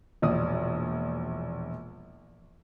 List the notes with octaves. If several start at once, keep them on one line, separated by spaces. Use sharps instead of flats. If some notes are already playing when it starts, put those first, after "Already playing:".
E1 A#1 D5 D#6